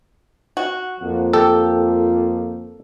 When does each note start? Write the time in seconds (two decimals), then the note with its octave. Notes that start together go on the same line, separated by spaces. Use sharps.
0.57 F#4
1.00 F2 F3 A#3
1.33 G4 A4